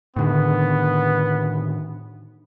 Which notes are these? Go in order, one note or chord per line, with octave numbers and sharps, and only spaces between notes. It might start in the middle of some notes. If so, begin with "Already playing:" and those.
A2 D3 D#3 B3